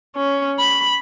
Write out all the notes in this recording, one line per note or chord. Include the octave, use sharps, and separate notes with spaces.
C#4
B5